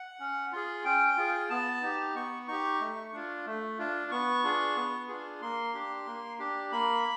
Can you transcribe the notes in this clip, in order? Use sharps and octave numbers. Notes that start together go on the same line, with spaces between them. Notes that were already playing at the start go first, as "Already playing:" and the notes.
Already playing: F#5
C#4
F4 G#4
C#4 G5
F4 G#4
B3 A5
D#4 G4
B3 C#6
D#4 G4 C#6
A3
D4 F4
A3
D4 F4
B3 C#6
D4 F4 G#4
B3
D4 F4 G#4
A#3 C6
D4 G4
A#3
D4 G4
A#3 B5